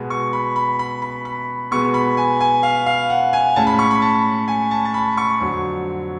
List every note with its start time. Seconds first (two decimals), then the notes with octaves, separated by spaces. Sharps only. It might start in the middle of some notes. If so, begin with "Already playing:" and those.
Already playing: B2 G#3 B3
0.10 C#6
0.33 B5
0.56 B5
0.79 B5
1.02 B5
1.25 B5
1.71 B2 G#3 B3 C#6
1.94 B5
2.17 G#5
2.41 G#5
2.63 F5
2.86 F5
3.10 F#5
3.33 G#5
3.56 A2 G#3 C#4 A5
3.67 B5
3.79 C#6
3.91 B5
4.02 A5
4.48 G#5
4.71 A5
4.85 A5
4.94 B5
5.17 C#6
5.40 F2 D3 F#3